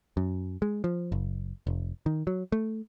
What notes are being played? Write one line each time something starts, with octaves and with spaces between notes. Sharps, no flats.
F#2
G#3
F3
F#1
F1
D#3
F#3
A3